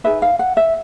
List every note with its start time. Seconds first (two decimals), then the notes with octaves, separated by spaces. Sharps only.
0.04 D#4 G#4 B4 E5
0.22 F5
0.39 F#5
0.57 E5